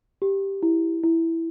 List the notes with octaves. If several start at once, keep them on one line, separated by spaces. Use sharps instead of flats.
G4
E4
E4